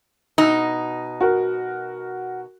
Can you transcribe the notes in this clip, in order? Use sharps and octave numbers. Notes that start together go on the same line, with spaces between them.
B2 D#4
F#4 A#4